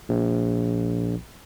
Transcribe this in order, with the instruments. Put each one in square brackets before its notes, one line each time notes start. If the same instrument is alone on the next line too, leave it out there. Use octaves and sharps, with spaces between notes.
[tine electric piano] A#1